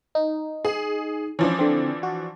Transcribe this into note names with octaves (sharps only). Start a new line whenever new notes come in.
D#4
G#4
E3 F3 C#4 D4
D3 C4
F#4